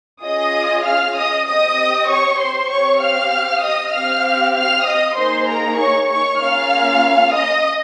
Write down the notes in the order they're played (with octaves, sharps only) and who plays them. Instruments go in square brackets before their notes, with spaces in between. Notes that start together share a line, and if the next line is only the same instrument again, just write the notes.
[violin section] C#4 F4 G#4 D#5 D#6
F5 F6
D#5 D#6
C4 G4 D#5 D#6
C#5 C#6
C5 C6
C4 G4 C#5 C#6
F5 F6
D#5 D#6
C4 G4 F5 F6
F5 F6
D#5 D#6
A#3 D#4 G#4 C5 C6
A#4 A#5
C#5 C#6
C#5 C#6
A#3 C#4 F4 G#4 F5 F6
D#5 D#6